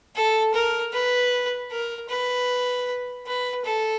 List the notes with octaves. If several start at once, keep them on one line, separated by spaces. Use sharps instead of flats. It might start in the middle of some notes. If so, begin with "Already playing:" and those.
A4
A#4
B4
A#4
B4
B4
A4